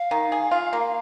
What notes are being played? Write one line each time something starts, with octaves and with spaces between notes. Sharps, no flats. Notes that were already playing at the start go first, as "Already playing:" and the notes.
Already playing: F5
D#3
G#4
F4
A#3